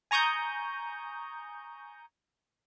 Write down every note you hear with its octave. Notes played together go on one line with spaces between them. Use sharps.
G#5 A#5 C#6 D#6 G6